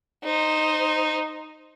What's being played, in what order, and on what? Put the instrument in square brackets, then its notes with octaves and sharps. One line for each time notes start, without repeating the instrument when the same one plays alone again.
[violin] D#4 C5